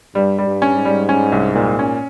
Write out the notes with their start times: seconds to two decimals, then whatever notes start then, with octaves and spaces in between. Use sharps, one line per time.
0.15 G2 G3
0.39 G3
0.47 G2
0.62 C#4
0.77 G#2
0.85 G3
1.09 C#4
1.32 C2
1.55 A#2
1.79 C#4